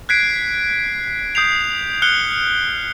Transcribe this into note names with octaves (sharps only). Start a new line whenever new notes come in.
F#6 G#6 B6 C7 D7
D#6 G6 C7 F7
F6 F#6 C7 C#7 G7